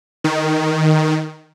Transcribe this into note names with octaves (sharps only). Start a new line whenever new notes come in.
D#3